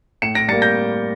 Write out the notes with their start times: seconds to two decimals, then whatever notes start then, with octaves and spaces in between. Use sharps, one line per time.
0.22 A2 C#7 E7
0.35 A#6 D7
0.49 G3 A#3 A6 C#7
0.62 G6 A#6